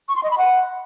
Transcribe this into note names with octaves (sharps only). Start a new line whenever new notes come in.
C#6
C6
D#5
B5
F#5